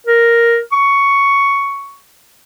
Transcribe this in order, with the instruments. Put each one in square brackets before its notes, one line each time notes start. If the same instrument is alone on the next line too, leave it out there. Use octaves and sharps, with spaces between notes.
[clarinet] A#4
C#6